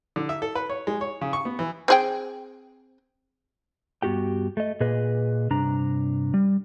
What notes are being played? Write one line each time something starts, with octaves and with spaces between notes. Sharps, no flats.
D3
E5
A4
B4
C#5
G#3
C#5
C#3
C#6
B3
E3
C4 G#4 G5
G2 B3 F#4 G4 G5
A3 D#5
A#2 G#4 B4 D#5
G2 C3 D4 A#5
G3